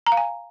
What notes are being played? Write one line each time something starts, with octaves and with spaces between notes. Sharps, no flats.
A#5
F5
G#5